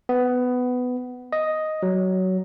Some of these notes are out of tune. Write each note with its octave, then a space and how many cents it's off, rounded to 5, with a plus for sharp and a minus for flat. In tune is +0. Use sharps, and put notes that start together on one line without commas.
B3 +15
D#5 +5
F#3 +15